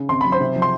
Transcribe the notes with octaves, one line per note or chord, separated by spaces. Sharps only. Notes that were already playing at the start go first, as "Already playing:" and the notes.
Already playing: C#3
G#1 C6
F#3 B5
C5 C6
C3
F3
C6